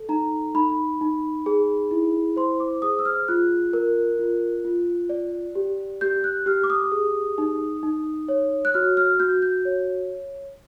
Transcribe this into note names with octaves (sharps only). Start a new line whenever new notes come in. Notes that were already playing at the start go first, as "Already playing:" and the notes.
Already playing: A4
D#4 A#5
D#4 B5
D#4
G#4
E4
C5 C6
D6
G#4 D#6
E6
F6
F4 F#6
A#4
F4
F4
D5
G4
G4 G6
F#6
G4 F6
D6
D#6
G#4
D#4
D#4
C#5
F#6
F#4 F6
F6
F#4 G6
G6
C#5